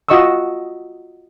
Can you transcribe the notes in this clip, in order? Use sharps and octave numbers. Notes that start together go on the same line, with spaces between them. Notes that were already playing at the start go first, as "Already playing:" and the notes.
F4 F#4 D#5 C#6 D#6 E6